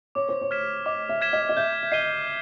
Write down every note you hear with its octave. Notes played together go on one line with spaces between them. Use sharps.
C#5 D6
C5
C#5
F6 G#6 B6 E7
D#5 D6
E5
F6 G#6 B6 E7
D#5
D#5
E5 G6
E5
D#5 C7 D#7 G7